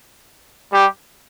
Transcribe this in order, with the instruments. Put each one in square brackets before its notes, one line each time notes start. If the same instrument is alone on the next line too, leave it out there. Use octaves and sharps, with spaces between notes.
[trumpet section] G3 G4